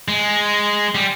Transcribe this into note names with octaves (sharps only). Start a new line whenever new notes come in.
G#3
G3